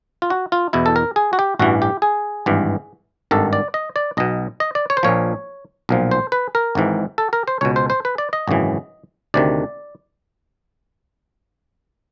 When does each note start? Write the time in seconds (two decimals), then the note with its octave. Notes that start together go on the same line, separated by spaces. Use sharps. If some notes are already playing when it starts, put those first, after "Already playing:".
0.22 F4
0.30 F#4
0.52 F4
0.73 E2 B2 E4
0.86 A4
0.96 A#4
1.16 G#4
1.33 F#4
1.39 G4
1.59 A1 G2 E3 F#4
1.82 G4
2.02 G#4
2.46 G#1 G2 E3
3.31 G#1 G2 D#3 A4
3.53 D5
3.74 D#5
3.96 D5
4.17 B1 B2 D#5
4.60 D#5
4.75 D5
4.90 C#5
4.97 C5
5.03 A#1 A#2 F3 C#5
5.89 B1 A#2 F3
6.11 C5
6.32 B4
6.55 A#4
6.75 G#1 G#2 E3
7.18 A4
7.33 A#4
7.48 C5
7.61 C#2 B2 C#5
7.76 C5
7.90 C5
8.05 B4
8.18 D5
8.33 D#5
8.48 G#1 F#2 C#3 E3
9.34 D2 C3 D#3 D5